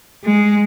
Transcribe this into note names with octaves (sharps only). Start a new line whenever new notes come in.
G#3